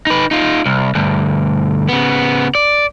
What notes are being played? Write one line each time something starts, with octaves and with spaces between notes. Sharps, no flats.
D#4 B4
D#4 F4
C2
D2 G2
C#3 B3
D5